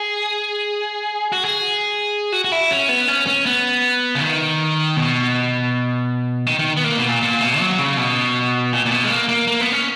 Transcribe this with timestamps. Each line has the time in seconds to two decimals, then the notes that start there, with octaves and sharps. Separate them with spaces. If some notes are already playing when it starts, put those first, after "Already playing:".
Already playing: G#4
1.32 F#4
1.45 G#4
2.32 F#4
2.45 F#4
2.52 E4
2.71 C#4
2.89 B3
3.08 C#4
3.27 C#4
3.46 B3
4.15 C#3
4.21 D#3
4.96 B2
6.47 D#3
6.59 D#3
6.77 B3
6.84 A#3
6.97 B2
7.09 A#2
7.22 A#2
7.41 B2
7.60 F#3
7.79 C#3
7.97 B2
8.73 A#2
8.86 A#2
8.91 B2
9.04 G#3
9.10 A#3
9.29 A#3
9.47 A#3
9.60 B3
9.72 C#4